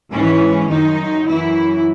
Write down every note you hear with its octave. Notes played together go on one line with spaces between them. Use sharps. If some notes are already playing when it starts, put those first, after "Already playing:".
G#2 E3 C#4
F#2 D#3 D#4
F#2 E3 E4